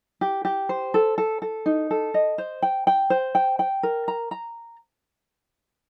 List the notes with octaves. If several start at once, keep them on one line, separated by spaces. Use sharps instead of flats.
G4
G4
C5
A4
A4
A4
D#4
A4
D#5
C5
G5
G5
C5
G5
G5
A#4
A#5
A#5